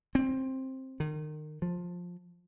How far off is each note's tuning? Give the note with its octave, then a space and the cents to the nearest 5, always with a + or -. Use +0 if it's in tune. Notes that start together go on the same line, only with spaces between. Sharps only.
C4 +10
D#3 -30
F3 +15